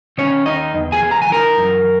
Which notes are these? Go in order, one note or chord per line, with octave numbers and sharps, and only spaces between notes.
D#3 C#4 C#5
D#2 D#4 D#5
E2
G#4 G#5
E3
A#5
G#5
E3 A#4 A#5
F#2